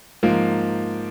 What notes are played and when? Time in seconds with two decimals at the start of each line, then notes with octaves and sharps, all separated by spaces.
0.23 G#2 F3 A#3